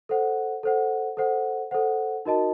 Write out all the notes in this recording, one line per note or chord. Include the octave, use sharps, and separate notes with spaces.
A4 C5 F#5
A4 C5 F#5
A4 C5 F#5
A4 C5 F#5
D#4 F#4 A#4 D#5 A5